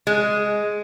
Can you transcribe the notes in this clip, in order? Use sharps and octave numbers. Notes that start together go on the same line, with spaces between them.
G#3